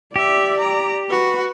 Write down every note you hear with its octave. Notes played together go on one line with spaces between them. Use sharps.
G4 D5 E5
A#5
F#4 B4